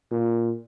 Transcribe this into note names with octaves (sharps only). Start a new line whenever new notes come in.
A#2